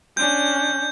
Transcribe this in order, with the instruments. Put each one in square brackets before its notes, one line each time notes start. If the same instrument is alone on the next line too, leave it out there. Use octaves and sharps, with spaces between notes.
[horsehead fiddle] C#4 D4 [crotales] G6